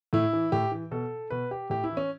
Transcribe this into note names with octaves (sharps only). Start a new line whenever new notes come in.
A2 E4
E3
A2 G4
E3
B2 A4
B2 B4
G4
A2 G4
E4
E3
C#4